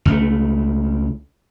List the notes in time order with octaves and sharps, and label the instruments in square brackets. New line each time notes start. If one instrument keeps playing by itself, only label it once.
[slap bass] C#2 A3